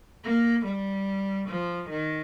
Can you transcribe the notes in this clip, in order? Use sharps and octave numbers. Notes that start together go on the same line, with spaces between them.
A#3
G3
F3
D#3